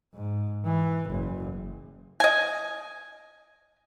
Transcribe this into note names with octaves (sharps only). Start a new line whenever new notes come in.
G#2
E3
F#1
D#5 G#5